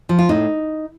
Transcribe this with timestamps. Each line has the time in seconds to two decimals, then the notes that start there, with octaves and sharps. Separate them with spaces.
0.09 F3
0.19 F4
0.29 A2 D#4